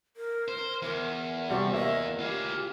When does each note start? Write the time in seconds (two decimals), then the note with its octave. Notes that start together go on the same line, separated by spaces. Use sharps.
0.17 A#4
0.48 C5
0.82 E2 A#4
1.50 C3 G3 F#4 C#6
1.74 A#3 D#5 E5
2.20 F4 G4 G#4